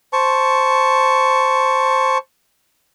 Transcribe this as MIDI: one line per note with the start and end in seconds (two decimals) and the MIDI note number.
0.13 2.18 72
0.13 2.18 81
0.13 2.18 85